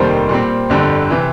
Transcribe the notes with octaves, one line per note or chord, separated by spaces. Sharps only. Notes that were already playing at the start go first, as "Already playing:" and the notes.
Already playing: F1 D#2 D#3 G3 A#4 C5
A#2 G3 C4
G1 F2 D3 G3
C3 E3